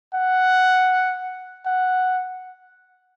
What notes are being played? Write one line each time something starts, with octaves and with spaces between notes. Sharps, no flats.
F#5
F#5